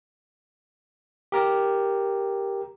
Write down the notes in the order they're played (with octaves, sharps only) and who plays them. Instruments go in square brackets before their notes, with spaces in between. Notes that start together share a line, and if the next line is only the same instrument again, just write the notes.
[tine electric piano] G4 A#4 A#5